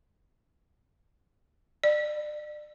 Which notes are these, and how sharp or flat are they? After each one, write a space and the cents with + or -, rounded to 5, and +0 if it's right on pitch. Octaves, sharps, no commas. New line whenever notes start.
D5 +35